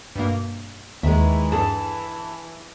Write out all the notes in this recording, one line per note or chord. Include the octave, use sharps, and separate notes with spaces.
G2 B2 A#3
D#2 D#3 E3 G#3 E5
G2 G#4 A4 A5